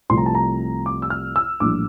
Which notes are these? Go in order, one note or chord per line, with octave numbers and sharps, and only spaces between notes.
C2 C3 F3 A3 C4 C6
A#5
A5
A#5
D6
E6
F6
E6
A#1 A2 E3 G3 A#3 D6